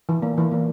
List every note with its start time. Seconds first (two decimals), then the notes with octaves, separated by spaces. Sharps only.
0.09 E3
0.22 A#3
0.38 E3
0.51 A#3